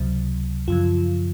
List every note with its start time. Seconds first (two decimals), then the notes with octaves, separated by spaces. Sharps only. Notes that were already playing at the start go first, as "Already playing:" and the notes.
Already playing: C#2 C3 F#3
0.68 F#2 C#3 F3 F4